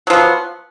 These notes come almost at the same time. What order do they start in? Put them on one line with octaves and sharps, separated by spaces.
F#3 F3 B3